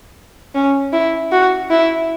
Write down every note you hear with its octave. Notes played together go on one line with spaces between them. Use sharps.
C#4
E4
F#4
E4